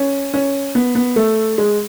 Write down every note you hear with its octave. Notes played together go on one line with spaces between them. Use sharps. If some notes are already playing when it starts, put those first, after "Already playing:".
Already playing: C#4
C#4
B3
B3
A3
G#3